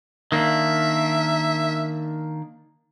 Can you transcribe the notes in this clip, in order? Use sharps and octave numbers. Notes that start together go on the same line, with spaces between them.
D#3 A#3 D4 E5